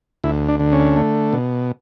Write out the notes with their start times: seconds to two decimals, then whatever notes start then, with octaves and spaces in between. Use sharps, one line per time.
0.24 D2 E4
0.49 D4
0.60 D3
0.72 C#4
0.96 A3
1.33 B2